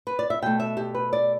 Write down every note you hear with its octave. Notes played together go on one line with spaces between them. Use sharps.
B4
D5
E5
B2 A3 G5
E5
G4
B4
D5